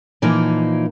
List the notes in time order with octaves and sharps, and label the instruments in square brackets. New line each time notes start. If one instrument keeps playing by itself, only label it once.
[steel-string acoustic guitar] A#2 E3 F3 A#3 D#4